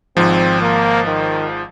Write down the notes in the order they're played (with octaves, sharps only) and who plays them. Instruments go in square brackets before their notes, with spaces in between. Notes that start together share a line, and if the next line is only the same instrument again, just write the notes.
[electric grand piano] G#1 G#2 F3 [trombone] C4
[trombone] A#3
D#3